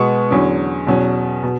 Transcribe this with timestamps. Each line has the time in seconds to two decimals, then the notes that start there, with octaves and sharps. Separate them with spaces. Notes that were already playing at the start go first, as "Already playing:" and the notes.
Already playing: B2 G#3 B3 C#6
0.31 E2 D3 F#3 C#4
0.87 E2 B2 F#3 C#4
1.43 B2